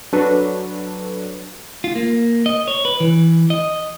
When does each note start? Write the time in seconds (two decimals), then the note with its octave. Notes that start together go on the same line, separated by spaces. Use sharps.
0.13 F#3 D4 F#4 A4 B4
1.84 F4
1.95 A#3
2.46 D#5
2.68 C#5
2.85 B4
3.00 E3
3.50 D#5